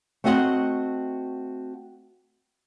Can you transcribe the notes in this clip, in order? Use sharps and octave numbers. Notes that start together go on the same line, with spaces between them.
A3 C4 F#4 D#5 F5 F#5